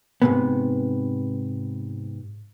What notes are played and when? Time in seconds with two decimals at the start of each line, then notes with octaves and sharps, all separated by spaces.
0.22 G#2 C3 B3